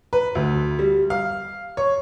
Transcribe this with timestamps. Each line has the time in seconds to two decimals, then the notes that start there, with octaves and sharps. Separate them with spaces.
0.13 B4
0.35 D2
0.79 G3
1.10 F5
1.77 C#5